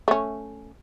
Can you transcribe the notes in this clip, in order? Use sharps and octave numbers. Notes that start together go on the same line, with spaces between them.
A3 C#4